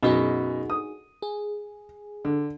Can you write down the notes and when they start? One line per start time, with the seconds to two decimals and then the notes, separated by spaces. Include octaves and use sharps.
0.03 F#2 B2 D#4 F#4 G#4
0.70 D#6
1.22 G#4
2.25 D3